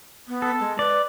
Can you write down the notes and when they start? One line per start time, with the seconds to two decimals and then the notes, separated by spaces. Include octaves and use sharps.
0.28 B3
0.42 A4
0.60 G#3
0.79 B4 D5